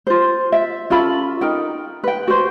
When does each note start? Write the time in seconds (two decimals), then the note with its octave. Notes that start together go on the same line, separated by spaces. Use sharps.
0.07 F4 C5
0.52 E5
0.90 C#4 F4 A4 B5
1.41 D#4 A#4 G5
2.04 B4 G5
2.28 F#4 B4 C5